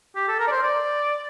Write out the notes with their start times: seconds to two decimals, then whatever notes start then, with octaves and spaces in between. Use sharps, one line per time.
0.16 G4
0.28 A4
0.39 A#4
0.47 D5
0.52 C5
0.63 D5